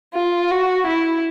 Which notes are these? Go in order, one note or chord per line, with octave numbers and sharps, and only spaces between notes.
F4
F#4
E4